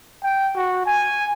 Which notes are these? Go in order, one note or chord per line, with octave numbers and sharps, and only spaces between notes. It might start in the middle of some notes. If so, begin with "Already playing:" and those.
G5
F#4
G#5